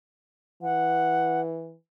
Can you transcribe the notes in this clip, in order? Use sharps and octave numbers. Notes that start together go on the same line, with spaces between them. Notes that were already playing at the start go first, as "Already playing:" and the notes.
E3 F#5